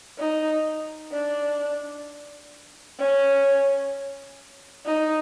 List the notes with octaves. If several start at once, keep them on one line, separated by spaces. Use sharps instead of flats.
D#4
D4
C#4
D#4